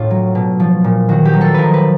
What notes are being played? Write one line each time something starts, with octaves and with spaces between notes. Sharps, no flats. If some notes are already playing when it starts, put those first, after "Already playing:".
Already playing: A2 D4 F4
F#3
B2
F3
A#2
D#3 F#4
G4
F#3
A4
F3 A#4 B4
B4